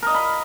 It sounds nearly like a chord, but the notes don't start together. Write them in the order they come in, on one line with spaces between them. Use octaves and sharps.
A#4 D#5 F5 B5